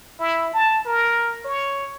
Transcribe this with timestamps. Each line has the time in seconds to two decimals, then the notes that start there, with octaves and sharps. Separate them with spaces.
0.19 E4
0.54 A5
0.86 A#4
1.45 C#5